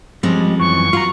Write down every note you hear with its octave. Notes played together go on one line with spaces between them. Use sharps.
F3 G3 G#3 C4 C#4
F#2 E3 C#6
F4 F#4 F#5 A#5